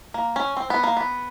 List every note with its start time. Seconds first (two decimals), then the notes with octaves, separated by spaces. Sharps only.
0.14 A#3
0.36 C#4
0.57 C4
0.70 B3
0.83 A#3
0.97 B3